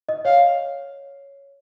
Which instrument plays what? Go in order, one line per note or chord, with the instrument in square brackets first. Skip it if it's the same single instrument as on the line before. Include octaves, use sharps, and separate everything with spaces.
[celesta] D#5
[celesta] C#5 [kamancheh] F5